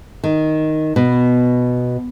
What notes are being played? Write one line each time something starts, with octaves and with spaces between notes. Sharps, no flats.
D#3
B2